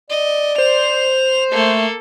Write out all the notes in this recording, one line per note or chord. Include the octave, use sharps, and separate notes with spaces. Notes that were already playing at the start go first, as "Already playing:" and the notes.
D5 D#5
C5 F7
A3 A#3 A4